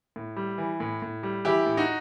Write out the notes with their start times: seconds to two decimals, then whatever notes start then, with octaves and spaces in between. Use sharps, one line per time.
0.16 A2
0.37 G3
0.58 E3
0.80 A2
1.02 A2
1.23 G3
1.45 E3 E4 G4
1.66 A2
1.77 D#4 F#4